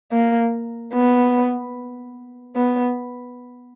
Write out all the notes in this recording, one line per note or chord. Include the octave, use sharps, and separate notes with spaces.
A#3
B3
B3